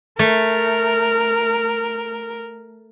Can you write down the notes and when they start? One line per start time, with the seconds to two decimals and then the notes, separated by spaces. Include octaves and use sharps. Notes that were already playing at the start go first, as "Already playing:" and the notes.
0.19 A3 A#4